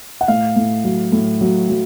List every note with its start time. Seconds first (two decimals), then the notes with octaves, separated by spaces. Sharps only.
0.21 F#5
0.28 A2 F5
0.56 A2
0.84 F#3
1.12 A2
1.41 F#3
1.69 F#3